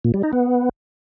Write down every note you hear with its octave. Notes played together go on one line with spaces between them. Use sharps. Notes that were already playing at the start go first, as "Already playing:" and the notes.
A#2
G3
D#4
B3